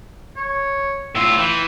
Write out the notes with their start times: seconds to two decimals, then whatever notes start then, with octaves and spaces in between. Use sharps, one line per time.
0.37 C#5
1.15 A2 F4 E6
1.38 E3 G5